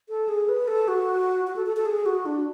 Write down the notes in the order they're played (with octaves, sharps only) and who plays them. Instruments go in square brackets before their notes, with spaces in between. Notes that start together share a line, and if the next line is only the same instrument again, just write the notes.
[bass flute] A4
G#4
B4
A4
F#4
F#4
A4
A4
A4
G#4
F#4
D4